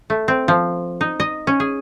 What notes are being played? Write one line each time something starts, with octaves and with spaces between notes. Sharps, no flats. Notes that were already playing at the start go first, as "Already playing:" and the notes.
A3
C4
F3
D#4
D#5
C#4
G#4